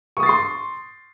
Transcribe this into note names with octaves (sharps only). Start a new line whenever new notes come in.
C6 C#6 D#6 A6 C7